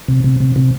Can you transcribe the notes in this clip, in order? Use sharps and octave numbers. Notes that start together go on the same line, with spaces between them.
C3
C3
C3
C3